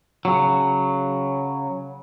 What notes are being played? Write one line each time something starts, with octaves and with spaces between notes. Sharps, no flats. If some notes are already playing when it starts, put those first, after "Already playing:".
C#3 F#3